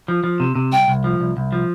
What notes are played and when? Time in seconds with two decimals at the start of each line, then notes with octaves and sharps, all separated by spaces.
0.08 F3
0.24 F3
0.40 C3
0.55 C3
0.72 C2 G5
0.88 C2
1.04 F3
1.20 C2
1.37 C2
1.53 F3